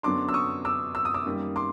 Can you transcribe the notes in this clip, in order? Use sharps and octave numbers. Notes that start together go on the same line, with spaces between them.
F#2 D3 F#3 B3 D4 C6 D6
E6
C#6 D#6
D6 E6
E6
D#6
D6 E6
F#2 D#3 G3 A#3
C6 D6